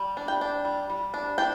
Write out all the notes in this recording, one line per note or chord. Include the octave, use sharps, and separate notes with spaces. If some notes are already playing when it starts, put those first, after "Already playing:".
Already playing: G3
D4
G5
D4
G3
G3
D4
D4 G5